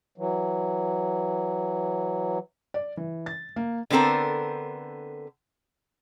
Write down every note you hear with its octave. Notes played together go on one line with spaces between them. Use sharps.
E3 F#3
D5
E3
A6
A#3
D3 B3 C4 A4 A#4